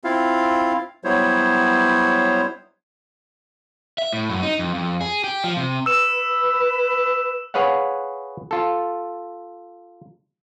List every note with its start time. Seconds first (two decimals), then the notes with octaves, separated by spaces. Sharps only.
0.04 C4 E4 F4 F5
1.04 F#3 G3 B3 E4 C5 C#5
3.98 E5
4.13 A2
4.30 F#2
4.43 D#4
4.59 F2
4.74 F2
5.01 G#4
5.24 G4
5.44 F3
5.57 C3
5.86 B4 E6 E7
7.54 G#4 B4 C#5 F5 F#5
8.51 F4 A4